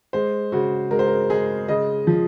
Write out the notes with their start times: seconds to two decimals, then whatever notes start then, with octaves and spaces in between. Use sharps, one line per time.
0.13 G#3 C5
0.52 C#3 F#4
0.91 G#3 A#4
0.99 C5
1.07 A#4
1.30 G#3 G#4
1.68 C#3 D#5
2.07 F3